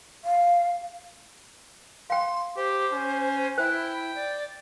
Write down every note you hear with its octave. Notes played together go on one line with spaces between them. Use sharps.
F5
F5 G5 C6
G4 C5
C#4
E4 C5 G5
D5